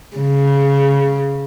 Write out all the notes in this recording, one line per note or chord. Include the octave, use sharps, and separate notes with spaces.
C#3